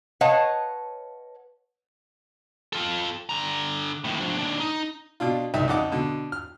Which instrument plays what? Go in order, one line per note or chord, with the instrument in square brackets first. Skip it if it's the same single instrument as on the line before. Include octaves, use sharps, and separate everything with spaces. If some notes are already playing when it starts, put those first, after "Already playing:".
[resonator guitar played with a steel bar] B4 C#5 D#5 F5 F#5 A5
[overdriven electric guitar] F4 A4
D3 A#5
D#2 A2
F3 D4
D#2 D4
D#4
[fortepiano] B2 D4 F4
C2 D#4 D5 E5 G5
F2 C#3 D#4 D#5 F#5 D6
B2 D3
F6